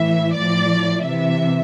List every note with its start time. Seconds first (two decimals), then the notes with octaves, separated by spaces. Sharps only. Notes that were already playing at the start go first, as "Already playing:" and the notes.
Already playing: A2 E3 E5
0.34 A2 F3 D5
1.05 C3 E3 E5